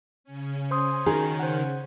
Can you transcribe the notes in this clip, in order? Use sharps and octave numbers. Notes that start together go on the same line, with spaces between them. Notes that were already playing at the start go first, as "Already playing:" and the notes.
C#3 C#4
C5 C6 D#6
D#3 F#4 G#4 A#5
C5 F#5